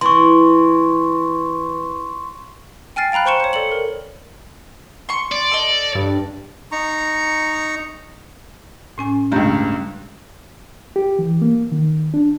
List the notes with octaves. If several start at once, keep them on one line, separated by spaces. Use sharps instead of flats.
E3 C6 C#6
G5 G#5 F6 A6 C7
F5 G5 A#5 B5 F#6
C5 G5 C6 C#6 C#7 E7
C5 C#5
A4 D5 C#7 F#7
A#4
C6 C#6
D5
A4 D#5
G2
D#4 A#5 C#6
A2 C#4 G#5
C#2 G2 A3 A#5 G6
G4
E3
A#3
D#3
D4